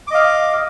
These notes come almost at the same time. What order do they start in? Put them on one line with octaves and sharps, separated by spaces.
D6 D#5 F5